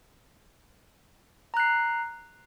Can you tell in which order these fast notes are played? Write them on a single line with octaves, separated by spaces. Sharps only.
A#5 F#6 C7